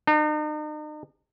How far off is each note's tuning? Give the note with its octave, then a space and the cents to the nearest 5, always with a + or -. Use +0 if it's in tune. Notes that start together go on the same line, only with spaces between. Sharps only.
D#4 -40